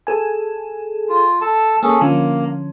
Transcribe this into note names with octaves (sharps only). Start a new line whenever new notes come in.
G#4 A4 G#5
F4
A4 A5
A#3 C#4 G#4 A4
D3 F3 A#3 C#4